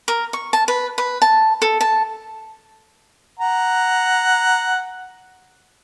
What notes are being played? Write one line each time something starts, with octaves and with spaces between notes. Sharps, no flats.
A#4
C#6
A5
B4
B4
A5
A4
A5
F#5 A#5